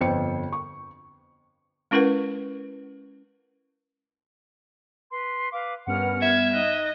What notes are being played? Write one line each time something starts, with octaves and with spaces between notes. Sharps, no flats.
G1 F2 C5 G5 C#7
C#6
G#3 C#4 E4 A#4 B4 F#5
B4 C6
B4 F5 D6
G2 B3 C#4 A#4 F#5 F6
E5 G#6
D#4 D#5 F#6